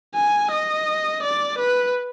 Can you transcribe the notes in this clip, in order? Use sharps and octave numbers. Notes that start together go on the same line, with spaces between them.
G#5
D#5
D5
B4